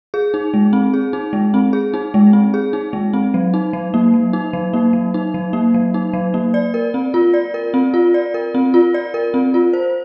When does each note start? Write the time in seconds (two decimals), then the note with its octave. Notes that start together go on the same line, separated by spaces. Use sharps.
0.14 G#4
0.34 D#4
0.54 G#3
0.73 C4
0.94 G#4
1.13 D#4
1.33 G#3
1.54 C4
1.73 G#4
1.94 D#4
2.14 G#3
2.33 C4
2.54 G#4
2.73 D#4
2.93 G#3
3.13 C4
3.34 F#3
3.54 D#4
3.73 F#3
3.94 A#3
4.14 F#3
4.33 D#4
4.53 F#3
4.74 A#3
4.93 F#3
5.14 D#4
5.34 F#3
5.53 A#3
5.74 F#3
5.94 D#4
6.13 F#3
6.34 A#3
6.54 D5
6.74 A#4
6.94 C4
7.14 F4
7.34 D5
7.54 A#4
7.74 C4
7.94 F4
8.14 D5
8.34 A#4
8.55 C4
8.74 F4
8.94 D5
9.14 A#4
9.34 C4
9.54 F4
9.73 C5